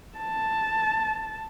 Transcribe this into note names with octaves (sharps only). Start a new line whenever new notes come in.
A5